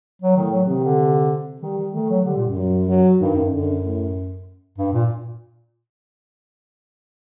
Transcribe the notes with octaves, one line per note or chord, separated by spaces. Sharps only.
F#3
A2 D#3
F#3
C3 D#3
D3
D#3 G3
D#3
D#3 A3
F#3
D3 G3
A#2
F#2
F#3
F#3
G2 D#3
F#2
F#2 D3
A2
G2
A#2